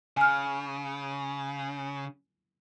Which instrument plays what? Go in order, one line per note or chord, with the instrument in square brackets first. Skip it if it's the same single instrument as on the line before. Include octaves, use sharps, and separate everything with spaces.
[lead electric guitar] C#3 [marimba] G#5 F6